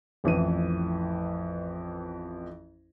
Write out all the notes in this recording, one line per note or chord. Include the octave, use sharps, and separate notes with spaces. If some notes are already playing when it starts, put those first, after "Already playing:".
A1 F2 E3 D#7